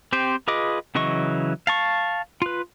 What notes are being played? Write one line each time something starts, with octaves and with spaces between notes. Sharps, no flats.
C4 G4 C5
F4 G#4 B4 D#5 D6
C#3 E3 F#3 D#5 C#6
F5 A5 C#6
F4 B4